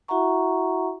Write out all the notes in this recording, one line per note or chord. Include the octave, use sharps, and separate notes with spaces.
E4 F#4 E5 F#5 A#5 C#6